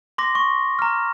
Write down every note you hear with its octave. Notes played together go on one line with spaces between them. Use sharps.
C6 D6 A#6
C#6
A#5 F6